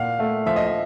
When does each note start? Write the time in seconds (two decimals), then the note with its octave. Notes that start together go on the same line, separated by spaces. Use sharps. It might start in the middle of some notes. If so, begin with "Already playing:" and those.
Already playing: A#2 F5 F#5
0.19 A3
0.46 F3 E5
0.56 D#5
0.67 E5